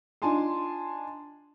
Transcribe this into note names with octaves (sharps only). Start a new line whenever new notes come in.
D4 D#4 F4 G#5 A5 C6